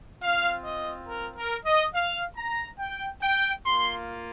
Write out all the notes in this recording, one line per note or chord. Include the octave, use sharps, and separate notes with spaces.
C4 F4 F5
D#5
A#4
A#4
D#5
F5
A#5
G5
G5
A#3 F4 C6